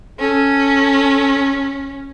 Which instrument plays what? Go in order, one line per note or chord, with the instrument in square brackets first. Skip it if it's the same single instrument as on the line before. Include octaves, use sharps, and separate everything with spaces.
[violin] C#4 [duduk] A4